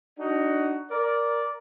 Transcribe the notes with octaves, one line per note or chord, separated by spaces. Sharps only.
D4 D#4 F#4
A#4 D5